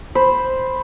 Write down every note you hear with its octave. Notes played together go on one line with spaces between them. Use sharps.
C5 B5